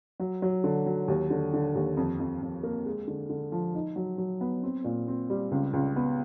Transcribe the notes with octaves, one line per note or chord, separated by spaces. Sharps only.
F#3
F#3
D3
F#3
D#2
D3
D3
D#2
F2
F2
F2
A#3
G#3
D3
D3
F3
D#4
F#3
F#3
B3
C4
A#2
C4
G3
C#2
C#2
B3